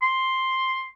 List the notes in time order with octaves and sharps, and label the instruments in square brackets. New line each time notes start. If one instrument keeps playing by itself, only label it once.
[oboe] C6